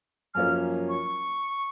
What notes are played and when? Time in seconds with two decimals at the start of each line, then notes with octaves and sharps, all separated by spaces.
0.34 F#2 F3 A#3 C#4 F6
0.89 C#6